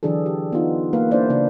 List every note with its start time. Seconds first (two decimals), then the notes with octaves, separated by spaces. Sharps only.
0.03 D3 E3 F#3 D4 G#4 A4
0.26 G4
0.52 B3 D#4 F4
0.93 A#3 B4 F5
1.11 A#3 C#4 D4 E4 C5 D5
1.29 C#3 A#3 C#4 D4